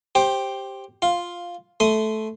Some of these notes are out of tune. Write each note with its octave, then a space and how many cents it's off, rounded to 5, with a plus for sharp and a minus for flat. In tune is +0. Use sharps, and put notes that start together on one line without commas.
G4 +0 C5 +15 G5 +0
F4 +0 F5 +5
A3 -15 C6 -15 D#6 +0